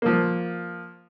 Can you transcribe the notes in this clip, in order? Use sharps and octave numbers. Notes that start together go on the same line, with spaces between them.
F3 A#3